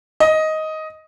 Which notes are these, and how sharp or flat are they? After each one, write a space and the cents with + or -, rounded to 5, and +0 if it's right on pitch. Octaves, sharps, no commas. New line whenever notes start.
D#5 +10